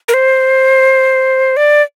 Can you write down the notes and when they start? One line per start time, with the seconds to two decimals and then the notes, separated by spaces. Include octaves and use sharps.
0.08 A#4
0.14 C5
1.57 D5